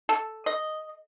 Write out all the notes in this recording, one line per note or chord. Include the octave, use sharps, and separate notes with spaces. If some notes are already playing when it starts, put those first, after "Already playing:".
A4
D#5